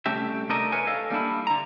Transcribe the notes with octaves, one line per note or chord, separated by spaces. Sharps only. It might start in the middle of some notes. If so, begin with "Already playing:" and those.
C2 A3 C#4 G4 E5
A3 D4 D#4 A4 A#4 D#5
A#4 B4 C#5 G#5
A4 D#5 F5
G3 A#3 D4 E4
D3 A#5